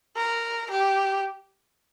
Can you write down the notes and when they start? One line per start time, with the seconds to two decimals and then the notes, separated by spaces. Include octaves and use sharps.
0.17 A#4
0.71 G4